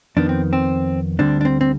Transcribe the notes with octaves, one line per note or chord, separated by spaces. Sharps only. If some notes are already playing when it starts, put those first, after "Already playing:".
F2 D#3 B3 D4
C4
C4
D2 D3 G3 C4 D4
D4
C4
C4